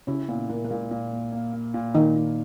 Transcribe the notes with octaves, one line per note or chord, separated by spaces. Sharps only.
C#3 C#4 E4
A#2 B3
A#2 A#3
A#3
A#2 G#3
A#2
A#3
A#3
A#3
A#2
A#2 D#3 D#4
A#2